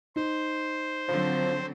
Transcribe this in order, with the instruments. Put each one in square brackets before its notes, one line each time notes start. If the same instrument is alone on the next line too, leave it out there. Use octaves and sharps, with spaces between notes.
[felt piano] D#4 [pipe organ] C5
[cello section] D3 F#3 C4 [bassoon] F3